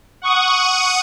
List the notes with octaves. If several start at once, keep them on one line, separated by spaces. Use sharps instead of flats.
F#5 C#6 D#6